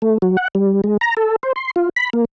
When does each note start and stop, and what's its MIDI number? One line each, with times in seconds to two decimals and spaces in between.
0.02 0.18 57
0.22 0.37 54
0.37 0.48 78
0.55 0.81 55
0.84 0.97 56
1.01 1.14 82
1.17 1.36 69
1.43 1.53 72
1.56 1.71 84
1.76 1.89 65
1.96 2.10 83
2.13 2.25 58